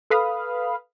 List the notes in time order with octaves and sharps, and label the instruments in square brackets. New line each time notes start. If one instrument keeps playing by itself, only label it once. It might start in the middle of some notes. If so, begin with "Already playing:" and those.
[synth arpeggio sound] A4 B4 F5 B5 D#6